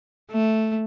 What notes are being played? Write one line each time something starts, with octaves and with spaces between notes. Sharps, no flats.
A3